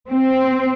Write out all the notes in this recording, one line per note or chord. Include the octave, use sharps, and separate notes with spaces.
C4